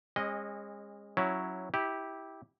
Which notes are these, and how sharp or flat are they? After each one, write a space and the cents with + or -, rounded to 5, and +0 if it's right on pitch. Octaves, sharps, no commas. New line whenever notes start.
G#3 -30 C#4 -40 D#5 +0
F#3 +0 C#4 +0 E4 +0
E4 -25 G4 +0